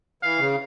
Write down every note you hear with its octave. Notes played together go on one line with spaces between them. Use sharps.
E3 F5
C#3